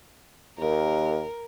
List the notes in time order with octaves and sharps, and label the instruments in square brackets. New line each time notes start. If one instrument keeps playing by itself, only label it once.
[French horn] D#2 [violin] A#4